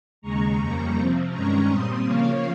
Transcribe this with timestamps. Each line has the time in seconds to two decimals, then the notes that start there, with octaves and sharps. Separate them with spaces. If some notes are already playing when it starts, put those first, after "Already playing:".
0.22 D#2 C#3 G#3 A#5 C#6
0.58 F2 C#3 G3 A#3
0.95 C3 F3 C4
1.31 G2 D#3 G#3 C#4 A#5 C#6
1.68 A#2 G3 C4 C6 D#6
2.05 C#3 F3 A#3 C#5 F5